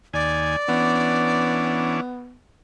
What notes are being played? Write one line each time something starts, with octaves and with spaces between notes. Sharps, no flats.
D#2 D5 G#5
E3 B3 C#4 D4